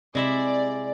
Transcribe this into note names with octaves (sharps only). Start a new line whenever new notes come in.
C3 G#3 E4 D5 E5